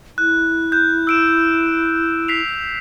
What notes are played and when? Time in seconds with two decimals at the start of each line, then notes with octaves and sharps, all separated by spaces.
0.18 E4 F#6
0.72 F#6 G6
1.07 E6 D7 E7
2.28 B6 C7 F7